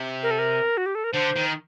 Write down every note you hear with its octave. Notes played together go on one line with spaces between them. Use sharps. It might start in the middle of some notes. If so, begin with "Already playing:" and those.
Already playing: C3
A#4
A4
A#4
F#4
G4
A4
A#4
D3 C5
D#3